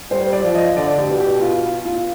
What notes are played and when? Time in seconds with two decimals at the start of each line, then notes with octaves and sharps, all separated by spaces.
0.11 G3 C5
0.33 D5
0.43 F3
0.54 D#5
0.76 D3 D5
0.98 G4
1.09 B2
1.20 G4
1.41 F4
1.85 F4